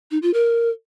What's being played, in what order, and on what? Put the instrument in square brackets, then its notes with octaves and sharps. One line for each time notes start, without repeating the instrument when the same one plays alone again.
[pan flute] D#4
F4
A#4